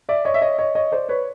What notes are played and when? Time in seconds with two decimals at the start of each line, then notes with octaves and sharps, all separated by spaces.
0.09 D5 E5
0.25 C#5 D#5
0.34 E5
0.41 C#5 D#5
0.58 C#5 D#5
0.75 C#5 D#5
0.92 C5 D5
1.09 B4 C#5